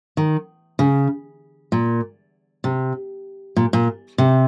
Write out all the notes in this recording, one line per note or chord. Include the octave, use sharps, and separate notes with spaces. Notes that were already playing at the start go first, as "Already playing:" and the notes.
D#3
C#3
A#2
C3
A#2
A#2
C3